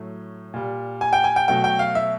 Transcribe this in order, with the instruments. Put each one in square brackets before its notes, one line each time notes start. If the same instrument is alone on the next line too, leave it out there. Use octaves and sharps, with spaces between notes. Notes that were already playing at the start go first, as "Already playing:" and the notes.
Already playing: [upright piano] A2 F#3 A3
A#2 G3
G#5
G5
G#5
G5
B2 F#3 A3 G5
G5
F5
E5